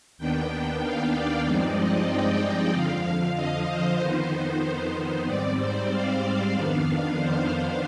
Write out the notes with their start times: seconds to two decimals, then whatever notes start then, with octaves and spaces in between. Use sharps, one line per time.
0.18 D#2 D#3 B3 D4 G5
0.82 F5
1.14 D5
1.45 G2 F3 G#3 C4 D#4
1.77 D#5
2.08 G5
2.72 F2 D3 F3 F5
3.35 D#5
3.68 C5
3.99 F2 D#3 B3 D#4
4.94 C5
5.26 G#2 G3 C4 D5
5.58 C5
5.90 F5
6.53 F2 D#3 B3 D4 F5
7.17 C5